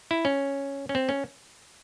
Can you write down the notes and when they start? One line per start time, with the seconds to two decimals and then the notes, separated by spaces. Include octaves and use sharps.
0.11 E4
0.25 C#4
0.89 C#4
0.95 C4
1.09 C#4